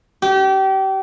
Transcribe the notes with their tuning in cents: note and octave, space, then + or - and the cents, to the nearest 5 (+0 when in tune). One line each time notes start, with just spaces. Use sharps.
G4 -30